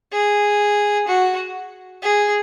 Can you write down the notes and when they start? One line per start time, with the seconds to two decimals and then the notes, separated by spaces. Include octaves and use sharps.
0.12 G#4
1.08 F#4
2.02 G#4